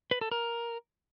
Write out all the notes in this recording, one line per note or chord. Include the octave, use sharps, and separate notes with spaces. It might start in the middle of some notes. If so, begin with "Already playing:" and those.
B4
A4
A#4